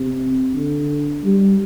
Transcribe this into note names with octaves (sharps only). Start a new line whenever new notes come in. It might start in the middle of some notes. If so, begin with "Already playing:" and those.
Already playing: C3
D3
G3